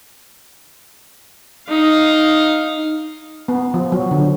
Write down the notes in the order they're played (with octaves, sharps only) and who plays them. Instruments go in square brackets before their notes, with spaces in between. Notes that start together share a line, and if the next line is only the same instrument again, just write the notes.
[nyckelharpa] D#4 F5
[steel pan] B3
F3
F#3
D3